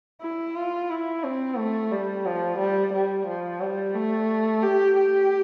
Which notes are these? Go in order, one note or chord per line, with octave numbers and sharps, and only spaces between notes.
E4
F4
E4
C4
A3
G3
F3
G3
G3
F3
G3
A3
G4
G4